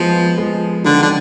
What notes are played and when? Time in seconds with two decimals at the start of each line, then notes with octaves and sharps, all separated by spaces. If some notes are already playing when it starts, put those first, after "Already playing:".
Already playing: F3 G#3 B3
0.37 F3 G#3
0.84 D3 D#3 F#3
1.02 D3